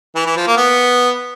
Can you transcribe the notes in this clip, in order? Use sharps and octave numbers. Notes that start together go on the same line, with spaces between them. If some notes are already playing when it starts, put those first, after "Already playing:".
E3
E3
F3
A#3
B3